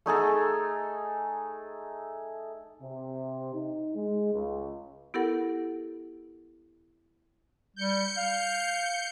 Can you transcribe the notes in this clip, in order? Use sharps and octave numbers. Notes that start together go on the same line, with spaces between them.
A3 D#4 G#4 A4
C3
D#4
G#3
C#2
B3 E4 G4 A4 A#4 F#5
G3 G6 C#7
F5